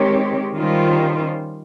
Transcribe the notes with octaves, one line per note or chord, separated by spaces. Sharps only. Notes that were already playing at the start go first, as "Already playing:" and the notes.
Already playing: D#3 G#3 C4 G4 C#5
D#3 G3 C#4 F4 C5